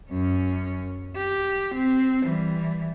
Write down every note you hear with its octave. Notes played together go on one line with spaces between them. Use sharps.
F#2 C#4
G4
C4
E3 G3